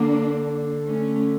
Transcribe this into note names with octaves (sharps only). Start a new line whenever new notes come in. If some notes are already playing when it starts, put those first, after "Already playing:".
Already playing: D3 A#3 D4
A3 C#4